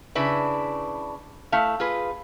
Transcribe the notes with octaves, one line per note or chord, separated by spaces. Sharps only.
C#3 D4 E4 B4
A3 E4 F5
F4 G#4 B4